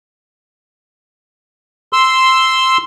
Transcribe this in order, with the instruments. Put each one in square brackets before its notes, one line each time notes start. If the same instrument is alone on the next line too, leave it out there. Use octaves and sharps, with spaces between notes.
[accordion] C6 E6